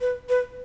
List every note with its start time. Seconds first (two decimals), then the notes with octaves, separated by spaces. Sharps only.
0.01 B4
0.29 B4